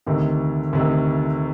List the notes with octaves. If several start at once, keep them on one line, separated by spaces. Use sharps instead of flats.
D2 C3 D#3
D2 C3 D#3